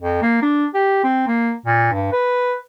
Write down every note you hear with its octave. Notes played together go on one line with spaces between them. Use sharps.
F2
A#3
D4
G4
C4
A#3
A#2
G2
B4